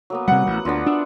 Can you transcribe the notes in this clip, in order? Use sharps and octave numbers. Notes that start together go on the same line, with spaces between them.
F#3 A#3 B3
C3 G3 F#5
A1
D2 B3 D4 F4
D4 E5